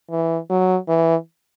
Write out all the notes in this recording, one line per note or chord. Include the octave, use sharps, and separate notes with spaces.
E3
F#3
E3